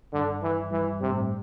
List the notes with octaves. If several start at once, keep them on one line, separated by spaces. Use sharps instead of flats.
G2 D3 G3
E3
G2 E3 G3
G2 C3 G3
A2 A3
G3